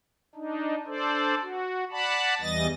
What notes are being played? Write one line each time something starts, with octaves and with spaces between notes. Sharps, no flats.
D4 D#4
D4 A4 C5 D5
F#4
D5 F#5 A5 B5
E2 E3 G3 D#5 A6 A#6